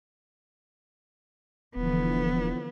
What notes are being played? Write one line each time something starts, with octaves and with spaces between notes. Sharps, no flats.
D#1 D3 E3 F3 B3